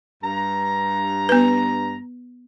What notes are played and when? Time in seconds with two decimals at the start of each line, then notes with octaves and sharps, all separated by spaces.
0.23 G2 A#5
1.29 B3 B4